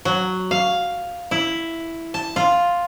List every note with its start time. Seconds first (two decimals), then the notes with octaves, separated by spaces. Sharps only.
0.05 F#3
0.51 F5
1.31 E4
2.14 A5
2.36 F4